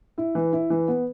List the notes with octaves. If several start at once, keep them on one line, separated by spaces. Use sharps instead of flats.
E4
E3
E4
E3
B3